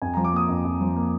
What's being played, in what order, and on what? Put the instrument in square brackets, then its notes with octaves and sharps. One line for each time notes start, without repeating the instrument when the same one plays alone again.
[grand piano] F2 G#5
F3 A#5
D6
A#3 D#6
F2
F2
F3
A#3